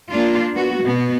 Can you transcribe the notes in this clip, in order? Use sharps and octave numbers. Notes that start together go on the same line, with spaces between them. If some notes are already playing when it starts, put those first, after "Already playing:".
A#3 D4 F4
B3 F#4
B2 B3